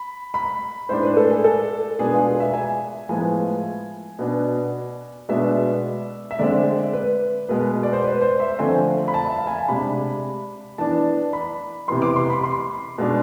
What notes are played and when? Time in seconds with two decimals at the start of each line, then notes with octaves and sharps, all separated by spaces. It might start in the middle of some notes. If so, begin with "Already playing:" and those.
Already playing: B5
0.34 B5
0.89 A2 G#3 D4 C5
1.03 B4
1.17 A4
1.31 G#4
1.44 A4
1.99 B2 G#3 B3 D4 G#4
2.14 F4
2.27 G#4
2.40 E5
2.54 G#5
3.09 A2 F3 G#3 B3 G#5
4.19 B2 B3 D4
5.29 B2 G#3 B3 D4 E5
6.31 E5
6.39 D3 G#3 C4 D5
6.93 B4
7.49 B2 G#3 B3 B4
7.83 D5
7.93 C5
8.04 B4
8.22 C5
8.40 E5
8.59 D3 F3 A3 C4 G#5
9.08 B5
9.14 A5
9.26 E5
9.37 F5
9.47 G#5
9.58 A5
9.68 C3 G#3 D4 B5
10.78 E3 B3 D4 A5
11.33 B5
11.88 C3 E3 B3 C6
12.02 D6
12.16 C6
12.30 B5
12.44 C6
12.98 B2 G#3 D4